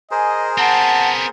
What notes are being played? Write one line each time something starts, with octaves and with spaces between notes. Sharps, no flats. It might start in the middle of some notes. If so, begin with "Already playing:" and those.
G#4 A#4 C5 D#5 G#5
B3 C4 F#5 A5